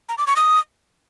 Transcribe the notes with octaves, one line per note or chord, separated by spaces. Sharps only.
A#5
D6
C#6
D#6